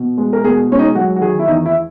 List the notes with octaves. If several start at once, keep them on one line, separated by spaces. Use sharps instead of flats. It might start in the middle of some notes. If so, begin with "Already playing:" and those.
Already playing: B2
G#3
A#4
B2 G#4
G#3 C#4
D#4
F#3 F#4
F#4
D#3 G#4
E4
E2 D#4
E4